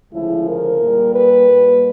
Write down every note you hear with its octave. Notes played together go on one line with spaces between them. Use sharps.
D2 C#3 F3 G#3 E4
A#4
A#2 G3
B4
A#2 G3